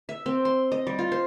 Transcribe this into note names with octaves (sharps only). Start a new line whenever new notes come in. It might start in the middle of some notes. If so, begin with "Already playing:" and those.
E5
C4
C6
D#5
G3
F4
C5